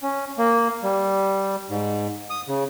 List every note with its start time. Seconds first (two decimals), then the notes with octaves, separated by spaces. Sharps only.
0.02 C#4
0.38 A#3
0.83 G3
1.70 G#2
2.30 D#6
2.48 C#3